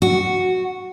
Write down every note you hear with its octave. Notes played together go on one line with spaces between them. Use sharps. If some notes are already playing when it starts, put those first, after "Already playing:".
F#4